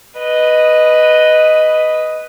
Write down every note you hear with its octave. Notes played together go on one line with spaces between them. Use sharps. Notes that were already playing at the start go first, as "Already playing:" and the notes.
B4 D#5